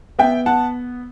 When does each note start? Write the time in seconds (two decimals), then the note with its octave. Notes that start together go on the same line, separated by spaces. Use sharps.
0.19 B3 E5 G5
0.46 F#5 A5